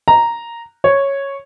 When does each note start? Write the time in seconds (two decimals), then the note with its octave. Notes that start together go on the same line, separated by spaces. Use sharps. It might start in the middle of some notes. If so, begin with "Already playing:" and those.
0.08 A#5
0.84 C#5